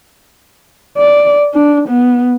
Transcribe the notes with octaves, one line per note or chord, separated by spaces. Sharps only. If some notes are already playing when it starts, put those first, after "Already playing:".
D5
D4
B3